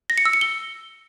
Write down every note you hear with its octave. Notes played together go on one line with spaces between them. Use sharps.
A#6
C#7
E6
C#7
G7